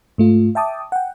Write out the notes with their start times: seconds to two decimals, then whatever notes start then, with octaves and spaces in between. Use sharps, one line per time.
0.18 G#2 A3 F4
0.55 E5 G5 A5 D6 D#6
0.92 F#5 G5